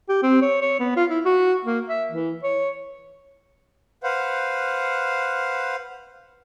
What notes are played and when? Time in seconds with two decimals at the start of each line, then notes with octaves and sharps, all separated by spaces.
0.09 G4
0.23 C4
0.42 C#5
0.62 C#5
0.80 B3
0.96 F4
1.10 E4
1.25 F#4
1.65 A#3
1.89 E5
2.12 E3
2.43 C#5
4.03 B4 C5 F5 F#5